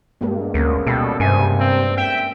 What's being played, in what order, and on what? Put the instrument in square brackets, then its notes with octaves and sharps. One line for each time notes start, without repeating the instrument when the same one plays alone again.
[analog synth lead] G2 [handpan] G#3 A#3 B3
[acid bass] D2 [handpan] A#3 C#4 A#4
[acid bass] B2 [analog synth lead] G3 [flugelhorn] A4
[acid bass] G2 [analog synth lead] C3 [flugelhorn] G#5
[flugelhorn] C4
[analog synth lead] E5 [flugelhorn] G5